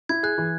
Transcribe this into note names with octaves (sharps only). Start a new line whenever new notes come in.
E4 G#6
G#4 F#6
E3